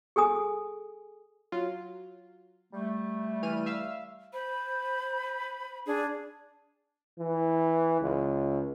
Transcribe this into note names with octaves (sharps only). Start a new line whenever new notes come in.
G#4 A4 G#5 D#6
F#3 F4
G3 A3
E3 F6 D#7
E5 F5 E6
C5 B5
D4 G#4
E3
C#2